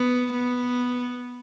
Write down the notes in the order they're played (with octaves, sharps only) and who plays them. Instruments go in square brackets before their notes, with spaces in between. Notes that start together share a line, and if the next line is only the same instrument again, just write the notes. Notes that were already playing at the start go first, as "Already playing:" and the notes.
Already playing: [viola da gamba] B3
B3